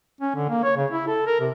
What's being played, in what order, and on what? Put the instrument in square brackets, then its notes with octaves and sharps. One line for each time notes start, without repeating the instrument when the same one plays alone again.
[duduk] C#4
D3
A#3
C#5
C#3
E4
A4
A#4
C3